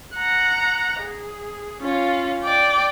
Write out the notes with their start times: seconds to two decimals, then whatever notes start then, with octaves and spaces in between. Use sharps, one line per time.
0.16 F#5 A#5
1.00 G#4
1.82 C#4 F4
2.44 D5 G5